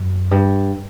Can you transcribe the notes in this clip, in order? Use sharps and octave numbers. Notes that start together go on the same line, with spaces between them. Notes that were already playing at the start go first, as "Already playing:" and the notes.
Already playing: F#2
G2